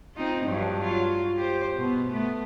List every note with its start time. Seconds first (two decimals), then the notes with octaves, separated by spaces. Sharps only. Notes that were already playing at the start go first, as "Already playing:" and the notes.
0.15 C4 D#4 F4
0.44 G2 F3 F#3
0.80 F#3 F4
1.37 G4 C5
1.75 B2 B3
2.11 A3 B3